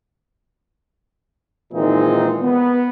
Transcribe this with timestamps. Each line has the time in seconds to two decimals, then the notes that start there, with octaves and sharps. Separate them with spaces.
1.73 A#2 D#3 E3 G#3 C4 D#4
2.43 B3